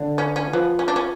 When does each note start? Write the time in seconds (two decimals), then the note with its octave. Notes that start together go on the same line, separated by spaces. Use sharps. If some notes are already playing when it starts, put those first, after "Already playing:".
Already playing: D3
0.18 C#4
0.36 C#4
0.53 F3 B3
0.79 C#4
0.88 D4
0.96 C#4